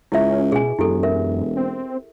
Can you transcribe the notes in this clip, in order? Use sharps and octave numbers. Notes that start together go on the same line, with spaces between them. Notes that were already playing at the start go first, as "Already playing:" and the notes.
C#2 C#4 E4 E5
B2 G#4 G#5
E1 F#2 E4 G4 A4
A#4 E5
C4